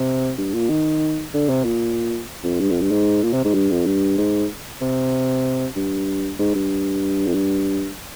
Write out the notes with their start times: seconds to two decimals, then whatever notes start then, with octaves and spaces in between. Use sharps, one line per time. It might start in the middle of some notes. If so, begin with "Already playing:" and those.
Already playing: C3
0.38 G2
0.54 A#2
0.69 D#3
1.34 D3
1.49 C3
1.65 A#2
2.44 F2
2.60 G2
2.70 F2
2.81 G2
2.91 G#2
3.23 A#2
3.33 C3
3.45 G#2
3.54 G2
3.71 F2
3.86 G2
4.18 G#2
4.81 C3
5.76 G2
6.39 G#2
6.55 G2
7.27 F2
7.34 G2